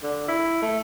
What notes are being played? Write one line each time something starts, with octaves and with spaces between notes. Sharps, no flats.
D3
E4
A3